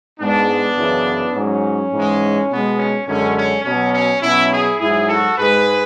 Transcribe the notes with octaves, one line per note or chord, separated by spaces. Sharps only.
G#2 G#3 B3 D4
F#2 C#3 E3
G#2 F#3 C#4
G#2 E3 G#3
B2 G#3 B3
C#4
F#2 D3 G#3 C#4
C#4
B2 F#3 C#4
C#4
B2 F#3 C#4 E4
E4 G#4
G#2 F#3 E4 G#4
F#4 A4
G#2 G#3 G#4 B4